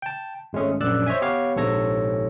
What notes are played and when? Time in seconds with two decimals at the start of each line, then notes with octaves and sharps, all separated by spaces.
0.02 G5 A5
0.53 G#1 G#3 A3 C#4 G#4
0.80 A#1 F#2 D5 E6 F#6
1.06 C5 C#5 D#5 E5 G#5
1.21 B3 G4 B4 C#5 F5
1.56 A#1 G#2 C3 A4 C#5 A#6